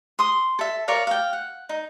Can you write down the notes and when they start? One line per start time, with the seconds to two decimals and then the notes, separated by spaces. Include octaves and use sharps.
0.19 C6 D#6
0.59 A4 E5
0.88 A#4 C#5 D5 F5
1.07 F5 G5
1.33 F#5
1.69 D#4